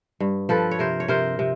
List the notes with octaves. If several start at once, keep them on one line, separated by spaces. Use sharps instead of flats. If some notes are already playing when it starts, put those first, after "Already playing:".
G2
F3 A4 B4
C#5
C3 A#4 C5
C#5
C3 A#4 C5
C3